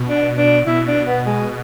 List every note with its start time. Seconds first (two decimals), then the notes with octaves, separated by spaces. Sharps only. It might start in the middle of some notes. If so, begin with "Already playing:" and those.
Already playing: B2
0.08 D4
0.38 D4
0.66 B2 E4
0.87 D4
1.06 B3
1.26 G#3